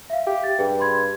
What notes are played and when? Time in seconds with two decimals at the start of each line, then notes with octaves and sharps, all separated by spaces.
0.10 E5 F5
0.26 G4
0.44 A6
0.59 G2 G#4 G5
0.79 B5 C6 G#6